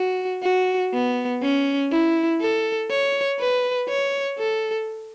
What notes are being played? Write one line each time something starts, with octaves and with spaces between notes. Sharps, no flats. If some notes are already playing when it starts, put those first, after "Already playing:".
Already playing: F#4
F#4
B3
C#4
E4
A4
C#5
B4
C#5
A4